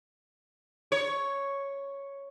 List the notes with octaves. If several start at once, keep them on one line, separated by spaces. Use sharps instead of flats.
C#5